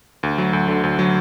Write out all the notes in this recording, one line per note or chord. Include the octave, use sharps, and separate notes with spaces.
D2
F#3
D2
D3
D2
F#3